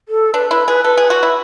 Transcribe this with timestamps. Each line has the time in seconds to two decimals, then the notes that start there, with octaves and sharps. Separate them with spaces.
0.09 A4
0.34 D4 B4
0.50 E4 B4
0.68 G#4 B4
0.84 A4 B4
0.97 G#4
1.10 F#4
1.23 E4